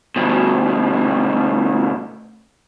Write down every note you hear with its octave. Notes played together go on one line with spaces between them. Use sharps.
D2 B2